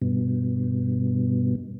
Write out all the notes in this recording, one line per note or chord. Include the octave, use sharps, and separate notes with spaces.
G2 B2